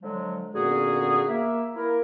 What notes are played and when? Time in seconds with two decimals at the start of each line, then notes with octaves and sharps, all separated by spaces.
0.03 D3 F3 F#3 G#3
0.55 A#2 D3 B3 C#4 F#4 G#4
1.29 A#3 E5
1.76 A#3 E4 A#4